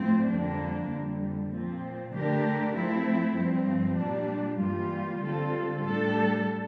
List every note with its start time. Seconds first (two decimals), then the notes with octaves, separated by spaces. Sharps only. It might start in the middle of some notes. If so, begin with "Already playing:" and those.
Already playing: A2 F3 C4
0.27 F2 D3 G3 A#3 D4
0.89 F2 D3 G3
1.51 A#2 F3 C4
2.12 D3 A3 D4 G4 A#4
2.74 F3 A3 C4 E4
3.36 G2 F3 C4
3.96 A#2 G3 D4
4.58 G2 E3 G3 A#3 F4
5.20 D3 G3 C4 F4 A4
5.82 A2 G3 D4 A4